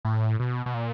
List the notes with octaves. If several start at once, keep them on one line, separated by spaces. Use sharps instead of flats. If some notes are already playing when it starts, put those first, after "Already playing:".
A2
B2
B2
A#2